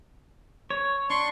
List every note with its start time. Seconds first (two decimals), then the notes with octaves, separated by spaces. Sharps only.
0.70 C#5
1.10 D4 C6 C#6